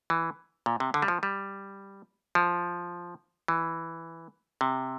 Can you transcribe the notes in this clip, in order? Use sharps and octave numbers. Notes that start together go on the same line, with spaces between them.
E3
A#2
C3
D3
G3
F3
G3
F3
E3
C3